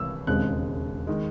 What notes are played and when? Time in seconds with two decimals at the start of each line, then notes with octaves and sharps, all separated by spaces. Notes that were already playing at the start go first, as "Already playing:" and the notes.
Already playing: C2 C3 E3 E6
0.27 E1 D#2 C#3 G#3 C4 F#6
1.07 D#3 G#3